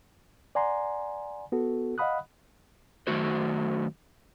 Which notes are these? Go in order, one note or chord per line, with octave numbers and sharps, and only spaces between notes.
D5 F#5 G#5 A#5 C6
B3 F#4 A4
D#5 F5 F#5 B5 D#6 F#6
F#2 D#3 A3 F#4 C5